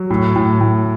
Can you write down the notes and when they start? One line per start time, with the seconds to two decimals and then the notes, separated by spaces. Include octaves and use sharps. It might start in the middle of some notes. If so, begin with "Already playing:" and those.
Already playing: F#3
0.10 A2
0.36 A2
0.60 A2